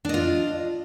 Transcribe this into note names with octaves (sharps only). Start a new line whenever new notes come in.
D4 F4 D#5